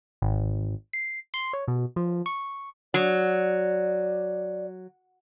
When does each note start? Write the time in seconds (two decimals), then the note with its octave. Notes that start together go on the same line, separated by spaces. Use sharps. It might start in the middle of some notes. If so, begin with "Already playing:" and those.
0.22 G#1
0.93 C7
1.34 C6
1.53 C#5
1.68 B2
1.96 F3
2.26 C#6
2.94 F#3 D5